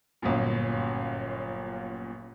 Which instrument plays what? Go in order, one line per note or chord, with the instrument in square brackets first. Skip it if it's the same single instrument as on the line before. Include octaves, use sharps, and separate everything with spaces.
[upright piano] G1 F#2 A#2